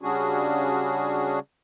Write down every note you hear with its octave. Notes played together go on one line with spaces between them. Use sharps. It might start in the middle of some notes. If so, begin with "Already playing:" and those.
C#3 G3 C#4 D4 F#4 G#4